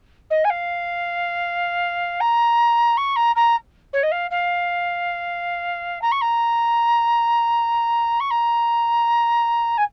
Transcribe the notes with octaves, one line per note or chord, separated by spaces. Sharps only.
D#5
G#5
F5
A#5
C#6
A#5
A#5
C#5
D#5
F5
F5
A#5
C#6
A#5
C#6
A#5
G#5